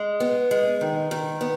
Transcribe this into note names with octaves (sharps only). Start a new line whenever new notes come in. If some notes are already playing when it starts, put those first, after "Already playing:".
Already playing: G#3
B3
G#3
D#3
D#3
B3